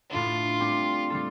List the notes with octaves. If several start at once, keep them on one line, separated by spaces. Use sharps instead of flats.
A2 A3 D4 F4 A4
G3 C4 G4
G3 F4 A4